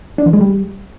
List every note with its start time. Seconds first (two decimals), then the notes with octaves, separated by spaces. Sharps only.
0.18 D4
0.26 E3
0.33 G#3
0.41 G3